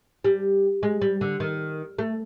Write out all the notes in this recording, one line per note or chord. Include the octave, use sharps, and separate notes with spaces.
G3
G#3
G3
D3
D#3
A3